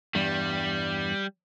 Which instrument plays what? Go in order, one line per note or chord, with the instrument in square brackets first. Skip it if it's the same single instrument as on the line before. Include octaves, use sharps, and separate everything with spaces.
[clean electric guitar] E2 G2 [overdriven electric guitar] G3